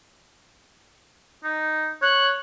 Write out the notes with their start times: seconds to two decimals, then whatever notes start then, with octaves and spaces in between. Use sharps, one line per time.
1.44 D#4
2.02 C#5 F#6